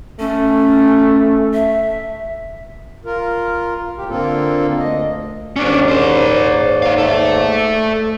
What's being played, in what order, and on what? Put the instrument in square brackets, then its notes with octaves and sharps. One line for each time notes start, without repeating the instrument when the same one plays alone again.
[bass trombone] A3 [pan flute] C#4
[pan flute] E5
[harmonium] F4 A#4
A2 G4
D3 A#3 C4 F4 A4
D2 D#5
[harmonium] D#2 G#2 D5 [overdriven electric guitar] C#4 D4
[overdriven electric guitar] A#4 C5
D#4 F5
A4 E5